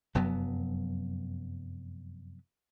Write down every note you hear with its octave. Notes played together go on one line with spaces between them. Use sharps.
F1 F#2 F#3 B3